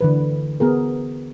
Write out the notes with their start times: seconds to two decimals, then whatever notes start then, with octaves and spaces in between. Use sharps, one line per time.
0.01 D3 E3 B4
0.60 B3 G#4 A#4